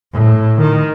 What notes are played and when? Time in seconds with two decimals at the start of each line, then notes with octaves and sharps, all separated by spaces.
0.12 A2
0.61 D#3